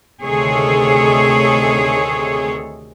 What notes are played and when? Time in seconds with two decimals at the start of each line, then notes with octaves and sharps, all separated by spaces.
0.22 D2 C3 D#3 G#4 A4 C#5